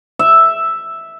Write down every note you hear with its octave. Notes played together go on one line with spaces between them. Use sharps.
E5